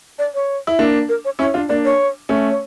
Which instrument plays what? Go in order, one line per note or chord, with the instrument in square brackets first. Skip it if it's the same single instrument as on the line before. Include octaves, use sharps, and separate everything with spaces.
[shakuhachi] D5
C#5
[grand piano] E4
A#3 D4
[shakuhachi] A#4
C#5
[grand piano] C#4 E4 [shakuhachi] C#5
[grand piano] D4 F4
[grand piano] A#3 D4 [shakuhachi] D5
[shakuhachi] C#5
[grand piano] A3 C#4
[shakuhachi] C#5